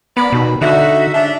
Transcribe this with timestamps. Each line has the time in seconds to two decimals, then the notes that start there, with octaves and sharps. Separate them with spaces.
0.17 B3 A#4 D5 B5
0.32 D#2 B2
0.62 D3 D#4 F#4 E5
1.14 G#2 C#4 D4